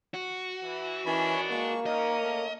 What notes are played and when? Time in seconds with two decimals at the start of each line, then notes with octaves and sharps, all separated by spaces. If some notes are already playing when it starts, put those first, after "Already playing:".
0.14 F#4
0.62 E3
1.06 D#3 E3 C#4 D4 C#5 B5
1.51 G#3 A#3 C#6
1.86 C#4 D#4 A#4 D#5
2.22 A3